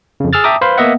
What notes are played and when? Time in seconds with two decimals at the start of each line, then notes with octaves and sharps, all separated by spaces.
0.20 F2 C#3
0.33 G#4 E6 F6 A6
0.44 E5 G5 A5 A#5 D6 D#6
0.61 B4 C5 F5 B5 C6
0.78 A#3 B3 D#5 E5 F#5